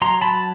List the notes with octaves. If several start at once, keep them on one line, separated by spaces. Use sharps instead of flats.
F#3 A#5 C6
F#3 A5 B5